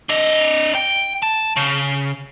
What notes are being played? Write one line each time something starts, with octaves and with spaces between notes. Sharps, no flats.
D4 D#5
G5
A5
C#3